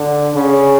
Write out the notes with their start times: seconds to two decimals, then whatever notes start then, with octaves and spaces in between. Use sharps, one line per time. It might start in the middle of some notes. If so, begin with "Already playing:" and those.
Already playing: D3
0.35 C#3